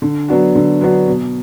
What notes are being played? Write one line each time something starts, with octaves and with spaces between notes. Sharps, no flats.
D3
F#3 B3 D4 F#4
D3
F#3 B3 D4 F#4
B2